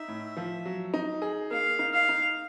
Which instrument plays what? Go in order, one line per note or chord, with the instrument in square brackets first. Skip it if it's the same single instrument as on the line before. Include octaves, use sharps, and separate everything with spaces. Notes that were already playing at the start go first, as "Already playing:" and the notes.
Already playing: [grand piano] D#4 [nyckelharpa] E5
[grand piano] A2
F3
F#3
D#4
G#4
[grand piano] A#3 [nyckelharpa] F5
[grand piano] D#4
[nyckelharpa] F5
[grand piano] D#4